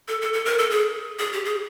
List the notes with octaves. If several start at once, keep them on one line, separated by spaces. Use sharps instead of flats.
A4
A4
A4
A#4
A4
G#4
G#4
G4
G#4